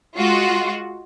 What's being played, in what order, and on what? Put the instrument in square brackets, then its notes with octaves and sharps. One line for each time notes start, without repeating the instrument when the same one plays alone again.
[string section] G#3 F4 F#4